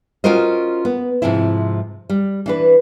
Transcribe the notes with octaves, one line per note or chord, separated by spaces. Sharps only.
C#4 F4 F#4 A#4 C5 D#5
B3
G#2 C3 F3 C4 E4
G3
E3 D4 B4